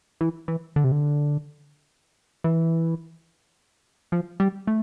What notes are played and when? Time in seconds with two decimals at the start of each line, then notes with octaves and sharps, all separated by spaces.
0.21 E3
0.48 E3
0.76 D3
0.84 C3
0.92 D3
2.44 E3
4.12 F3
4.40 G3
4.67 A3